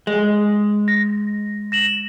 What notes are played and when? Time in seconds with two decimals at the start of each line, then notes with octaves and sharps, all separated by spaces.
0.07 G#3
0.88 A#6
1.72 A#6 E7 F#7